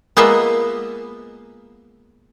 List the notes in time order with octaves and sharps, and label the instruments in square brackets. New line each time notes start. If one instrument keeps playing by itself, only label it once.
[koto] G#3 A#3 B3 F4 D#5 E5